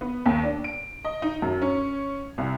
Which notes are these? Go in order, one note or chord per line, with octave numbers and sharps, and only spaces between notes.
B3
D#2
D4
D7
D#5
D#4
F#2
C#4
C2